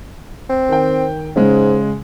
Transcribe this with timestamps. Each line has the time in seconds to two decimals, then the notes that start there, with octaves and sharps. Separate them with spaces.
0.49 C4
0.69 D#3 G5
1.36 G#2 C#3 G#3